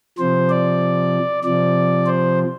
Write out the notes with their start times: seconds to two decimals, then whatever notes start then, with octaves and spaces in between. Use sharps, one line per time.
0.18 C3 F3 C5
0.50 D5
1.44 C3 F3 D5
2.06 C5